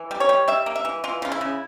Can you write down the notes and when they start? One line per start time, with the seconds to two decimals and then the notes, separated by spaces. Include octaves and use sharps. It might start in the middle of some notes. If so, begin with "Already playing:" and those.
Already playing: E3
0.11 G3
0.20 C#5
0.29 G3
0.48 G3 E5
0.66 A#3
0.76 E5
0.85 E3
1.04 E3 F4
1.22 C#3 F4
1.32 E4
1.41 C#3